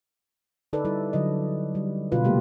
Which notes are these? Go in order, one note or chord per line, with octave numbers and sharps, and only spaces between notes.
D3 D#4 A4 B4 D5
G3 E4 A4
D3 F#3 D#5
G3
B2 D3 F4 B4
C3 G3 A3 A#3 G4